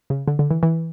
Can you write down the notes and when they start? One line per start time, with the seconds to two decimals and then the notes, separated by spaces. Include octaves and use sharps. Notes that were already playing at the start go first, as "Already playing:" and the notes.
0.10 C#3
0.28 D3
0.39 D3
0.51 E3
0.63 E3